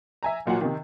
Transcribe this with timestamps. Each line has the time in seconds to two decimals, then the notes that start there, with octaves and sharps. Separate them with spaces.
0.23 E5 G#5 A#5
0.46 A1 A#2 F#3 F#5
0.61 C3 D#3